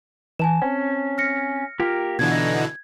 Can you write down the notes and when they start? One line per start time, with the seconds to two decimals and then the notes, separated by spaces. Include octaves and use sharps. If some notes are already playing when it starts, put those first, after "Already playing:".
0.39 E3 G#5 A5 E7
0.62 C4 C#4
1.18 F6 A#6 C#7
1.80 A#3 F4 G4 A#4
2.19 B2 D3 E3 G#6
2.32 D#4